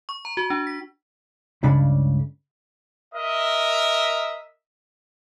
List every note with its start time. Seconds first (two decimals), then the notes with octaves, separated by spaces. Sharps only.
0.09 C#6
0.25 A#5
0.37 F#4
0.50 D4
0.67 B6
1.63 C#2 G2 C#3 D4 B5
3.15 A#4 D#5 E5